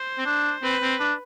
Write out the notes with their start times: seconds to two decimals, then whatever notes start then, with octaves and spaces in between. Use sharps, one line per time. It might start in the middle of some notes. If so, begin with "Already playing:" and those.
Already playing: C5
0.18 C4
0.26 D4
0.63 C4 B4
0.82 C4
1.00 D4